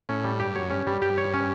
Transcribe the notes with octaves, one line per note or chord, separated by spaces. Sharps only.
A2 C#4
G3
G2 G4
F#2 C#5
G2 C#4
G2 G3
G2 G4
C#5
C#4